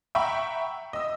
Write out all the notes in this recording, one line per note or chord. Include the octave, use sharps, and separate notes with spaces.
E5 F#5 G5 A#5 B5 C#6
D#5 E6